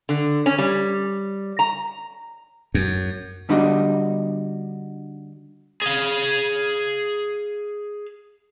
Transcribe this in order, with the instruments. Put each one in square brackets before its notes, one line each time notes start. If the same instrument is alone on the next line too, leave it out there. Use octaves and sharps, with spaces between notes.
[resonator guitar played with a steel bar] D3
C#4
G3
A#5
[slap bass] F#2
[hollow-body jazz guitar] D3 G3 D4 D#4 F#4
[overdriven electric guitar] G#4 F5